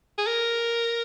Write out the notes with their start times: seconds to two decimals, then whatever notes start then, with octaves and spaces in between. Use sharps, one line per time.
0.18 G#4
0.27 A#4